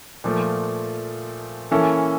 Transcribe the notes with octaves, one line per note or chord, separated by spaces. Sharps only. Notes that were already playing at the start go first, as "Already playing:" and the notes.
A#2 F3 A3
E3 A#3 C#4 E4 A4